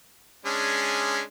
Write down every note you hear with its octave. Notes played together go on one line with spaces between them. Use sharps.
G#3 C#4 D4